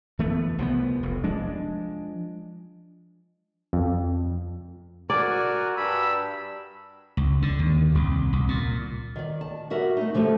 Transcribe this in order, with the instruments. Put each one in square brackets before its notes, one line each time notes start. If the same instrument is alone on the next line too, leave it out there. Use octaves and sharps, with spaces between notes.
[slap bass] E3 A3 B3
C2 F3 G3 B3
F1
F3 G#3 D4
[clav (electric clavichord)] F2
[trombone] F#4 [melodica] A#4 G#5 [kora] D5
[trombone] G2 [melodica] B5 [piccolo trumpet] E6
[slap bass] C#2
D3
D#2
C2
C2
A#2
[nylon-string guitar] D#3 D5
A5
G3 F#4 A#4 E5
A3 D#4
D3 F3 G3 A3